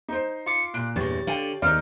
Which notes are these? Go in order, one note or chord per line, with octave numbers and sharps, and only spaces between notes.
D#4 C5
F4 D6 C7 C#7
A#2 F#6 D7
E2 G2 G4 C#5 A6
D3 F5 G5
D#2 D#4 D5 F6